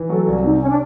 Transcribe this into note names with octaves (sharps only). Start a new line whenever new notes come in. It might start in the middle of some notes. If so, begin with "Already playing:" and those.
Already playing: E3
F#3 A4
C2
C3 D#4
C#4
D4